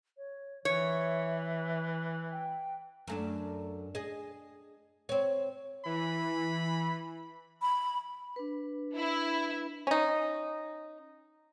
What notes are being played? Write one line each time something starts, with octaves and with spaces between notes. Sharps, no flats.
C#5
E3 C#5 E5
G5
F#2 A3 D4
G#4 D#5
C4 C#5
E3 B5
B5
D4 B4
E4
C#4 D#4